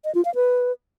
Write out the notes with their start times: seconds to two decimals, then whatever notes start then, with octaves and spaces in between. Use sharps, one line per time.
0.05 D#5
0.15 F4
0.25 F5
0.35 B4